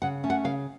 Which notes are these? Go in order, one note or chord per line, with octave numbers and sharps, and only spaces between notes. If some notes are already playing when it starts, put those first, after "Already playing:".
C#3 F#5
A3 C#4
F#5
C#3 F5